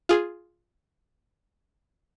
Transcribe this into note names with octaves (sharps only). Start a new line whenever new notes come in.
F4 G#4